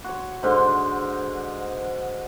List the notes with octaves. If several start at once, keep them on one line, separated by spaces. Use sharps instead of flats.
F#4 C#5
G#2 D3 C6